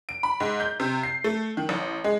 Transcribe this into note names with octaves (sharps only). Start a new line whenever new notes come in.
D7
B5
G#2
G6
C3
C7
A3
D#3
A1
G#3